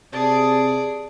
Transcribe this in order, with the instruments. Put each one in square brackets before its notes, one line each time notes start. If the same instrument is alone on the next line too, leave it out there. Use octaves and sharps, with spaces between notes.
[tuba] C3 [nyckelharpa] G#4 D5 [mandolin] A5